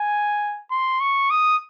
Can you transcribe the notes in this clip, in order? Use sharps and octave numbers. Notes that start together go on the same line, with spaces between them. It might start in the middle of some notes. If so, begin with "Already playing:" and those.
Already playing: G#5
C6
C#6
D#6